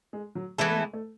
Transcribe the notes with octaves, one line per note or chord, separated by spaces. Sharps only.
G#3
F#3
E3 G#3 B3 E4 A4
A3
G#3
A3